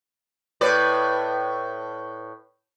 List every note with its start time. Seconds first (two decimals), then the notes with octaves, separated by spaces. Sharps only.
0.61 A2 B4 D5